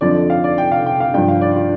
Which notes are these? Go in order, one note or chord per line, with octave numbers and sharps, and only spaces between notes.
F2 D3 F3 D5
F5
D5
G5
F5
G5
F5
G2 F3 G5
F5
D5
F4